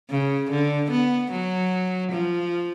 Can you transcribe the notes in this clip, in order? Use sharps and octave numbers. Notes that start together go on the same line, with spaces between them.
C#3
D3
B3
F#3
F3